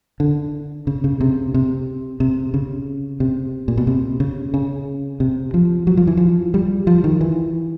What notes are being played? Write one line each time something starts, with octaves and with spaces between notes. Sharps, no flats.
D3
C#3
C#3
C3
C3
C3
C#3
C3
A#2
B2
C3
C#3
C#3
C3
F3
F#3
F3
E3
F3
G3
F3
D#3
E3